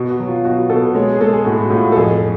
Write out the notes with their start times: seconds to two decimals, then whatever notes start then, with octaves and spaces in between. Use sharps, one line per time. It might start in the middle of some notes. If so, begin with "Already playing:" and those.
Already playing: B2 F#4
0.11 F#4
0.20 F#3
0.28 F4
0.45 B2 F#4
0.70 B2 A4
0.95 G#3 C#5
1.13 G#4
1.21 G#3 A4
1.33 G#4
1.45 A2 F#4
1.58 F#4
1.70 A2 F4
1.84 F#4
1.92 A4
1.96 F2 G#4